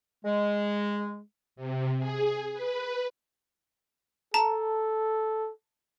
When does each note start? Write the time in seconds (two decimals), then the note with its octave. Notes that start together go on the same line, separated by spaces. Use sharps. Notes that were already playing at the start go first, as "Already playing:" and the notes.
0.25 G#3
1.56 C3
1.99 G#4
2.54 B4
4.34 A4 A5 A#5